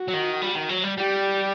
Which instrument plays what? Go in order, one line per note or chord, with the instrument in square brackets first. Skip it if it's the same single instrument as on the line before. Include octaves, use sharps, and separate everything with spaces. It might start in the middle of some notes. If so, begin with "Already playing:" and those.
Already playing: [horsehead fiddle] F#4
[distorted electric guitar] F#3
D#3
G3
D#3
F#3
G3
[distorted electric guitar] G3 [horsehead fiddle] G4